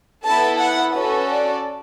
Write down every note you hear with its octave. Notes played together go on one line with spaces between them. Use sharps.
B3 E4 A4 A5
F#5
C#4 F#4 A4 B4
D5